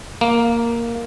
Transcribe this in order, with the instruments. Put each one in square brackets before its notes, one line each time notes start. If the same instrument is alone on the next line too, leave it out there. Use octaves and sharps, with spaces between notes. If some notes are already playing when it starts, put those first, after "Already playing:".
[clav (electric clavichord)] A#3